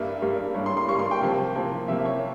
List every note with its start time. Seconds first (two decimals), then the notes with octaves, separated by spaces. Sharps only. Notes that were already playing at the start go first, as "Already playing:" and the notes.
Already playing: G2 G3 A#3 E5
0.22 G2 G3 A#3
0.54 G2 G3 A#3 C#5
0.66 C6
0.77 C6
0.88 G2 G3 A#3 C#6
0.99 C6
1.11 G5
1.22 C3 F3 A#3
1.55 C3 F3 A#3
1.88 C3 F3 A#3 E5
2.05 C#5